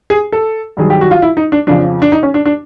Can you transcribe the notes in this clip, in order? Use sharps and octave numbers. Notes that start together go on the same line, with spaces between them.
G#4
A4
G2 D#3 F#3 G#4
G4
F#4
F4
E4
D#4
D4
F2 C#3 F3 D4
D4
D#4
C#4
D4
D4